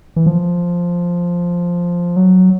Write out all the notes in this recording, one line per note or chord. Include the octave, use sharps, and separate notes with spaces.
E3
F3
F#3